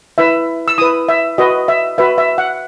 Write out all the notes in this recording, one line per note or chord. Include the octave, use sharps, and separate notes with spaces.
E4 B4 E5
E6
E4 B4 D#6
E5
F#4 B4 D#5
E5
F#4 B4 E5
E5
F#5